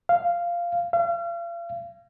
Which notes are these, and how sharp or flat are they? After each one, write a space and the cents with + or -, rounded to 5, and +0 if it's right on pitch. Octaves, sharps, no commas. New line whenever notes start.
F5 -10
F5 -40